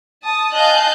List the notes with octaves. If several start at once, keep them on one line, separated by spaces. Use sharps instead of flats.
A5 D#6
D#5 F5 G#5 A5 F#6 G6